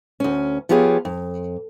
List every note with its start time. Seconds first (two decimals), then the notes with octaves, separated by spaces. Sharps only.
0.20 D2 C#4
0.69 F3 B3 F4 G4 G#4 C#5
1.05 F2